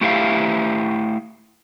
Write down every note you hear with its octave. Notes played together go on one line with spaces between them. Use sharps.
A3 E4 G4 E5 F5